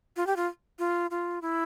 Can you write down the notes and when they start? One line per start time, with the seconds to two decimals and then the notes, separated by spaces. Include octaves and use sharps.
0.16 F4
0.27 G4
0.36 F4
0.79 F4
1.11 F4
1.42 E4